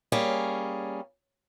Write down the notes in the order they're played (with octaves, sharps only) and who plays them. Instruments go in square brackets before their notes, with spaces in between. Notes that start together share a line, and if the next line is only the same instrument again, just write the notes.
[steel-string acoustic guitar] G3 A#3 C#4 G#4